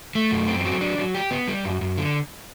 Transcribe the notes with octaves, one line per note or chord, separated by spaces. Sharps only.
A3
F#2
C4
F#3
D4
F#3
G4
B3
G3
F#2
F#2
D3